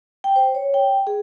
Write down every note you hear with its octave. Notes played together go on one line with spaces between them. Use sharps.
G5
C5
C#5
G5
G#4